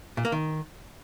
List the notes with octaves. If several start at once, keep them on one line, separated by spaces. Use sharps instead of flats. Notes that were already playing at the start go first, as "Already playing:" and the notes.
A#2
A#3
D#3